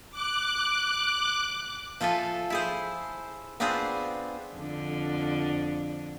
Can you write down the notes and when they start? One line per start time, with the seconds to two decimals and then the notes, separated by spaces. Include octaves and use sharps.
0.11 D6 F#6
2.01 F3 F4 A4 E5 G#5
2.50 E4 G#4 C5
3.60 B3 C4 D4 F4 G#4 C5
4.54 F2 D3